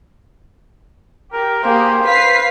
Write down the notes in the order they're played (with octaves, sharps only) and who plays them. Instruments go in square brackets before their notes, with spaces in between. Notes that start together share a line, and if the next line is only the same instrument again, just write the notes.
[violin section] G4 [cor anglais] A#4
[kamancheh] A#3 [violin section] G4 G#4 [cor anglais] C5
[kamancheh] B4 F5 [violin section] B6 C7